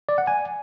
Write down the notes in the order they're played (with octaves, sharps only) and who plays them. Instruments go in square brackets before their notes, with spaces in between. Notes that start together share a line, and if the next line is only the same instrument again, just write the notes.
[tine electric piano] D5
F#5
G#5